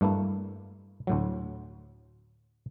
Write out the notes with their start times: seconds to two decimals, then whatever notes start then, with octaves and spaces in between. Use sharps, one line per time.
0.01 G2 A3 A#3 E4
1.07 D2 A2 F#3